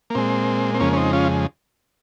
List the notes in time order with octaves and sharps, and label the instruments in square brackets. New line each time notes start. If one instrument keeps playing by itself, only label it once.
[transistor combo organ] A#3
A#2 G#3 C4
C4
F2 C#3 G#3 A#3 C#4
C#4
C4 D#4
C#4 F4